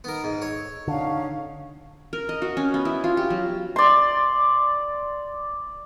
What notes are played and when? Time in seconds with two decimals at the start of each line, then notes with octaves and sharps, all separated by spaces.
0.04 B3 D#4 A#4
0.24 G#2
0.42 A4 C#5
0.88 D3 C#4 D#4 F5
2.13 A#4
2.29 D#5
2.42 F#4
2.57 C#4
2.74 B3
2.85 E4
3.04 F4
3.17 G4
3.30 F#3
3.76 D5 C6